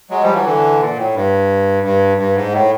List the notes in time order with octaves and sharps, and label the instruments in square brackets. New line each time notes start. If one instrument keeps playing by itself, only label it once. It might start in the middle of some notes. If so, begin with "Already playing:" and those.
[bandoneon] F#3 G#3
F3 G3
E3 F#3
D3 E3
A#2
A2
G2
G2
G2
G#2
A2